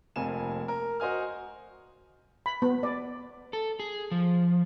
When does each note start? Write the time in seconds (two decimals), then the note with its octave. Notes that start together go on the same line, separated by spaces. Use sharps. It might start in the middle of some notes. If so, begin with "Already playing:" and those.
0.16 F1 F2 A#3 G#5 E7
0.68 A#4
1.00 F#4 C5 D#5 G#5 F6
2.46 B5
2.62 B3
2.83 D5
3.53 A4
3.80 G#4
4.11 F3